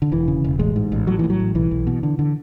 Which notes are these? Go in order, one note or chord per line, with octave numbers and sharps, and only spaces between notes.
D3
E1 E3
C#3
E1
A1 G#3
G#2
A1
A2 F#3
A2 E3
F#3
A1
B1 E3
B1
B2
D3
D3